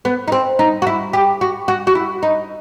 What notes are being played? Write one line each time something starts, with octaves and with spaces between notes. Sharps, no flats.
B3
D#4
C4
D#4
F#4
E4
G4
F#4
F#4
F#4
E4
D#4